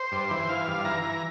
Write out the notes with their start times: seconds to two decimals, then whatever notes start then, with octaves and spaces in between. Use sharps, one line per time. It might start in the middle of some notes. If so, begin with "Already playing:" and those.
Already playing: C5
0.12 G2
0.31 E3
0.48 E3 F5
0.67 G2
0.85 E3 A#5
1.03 E3